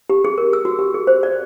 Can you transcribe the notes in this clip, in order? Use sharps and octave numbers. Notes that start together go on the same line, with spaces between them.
G4
G#4
A#4
E6
F#4
G4
G#4
C5
D5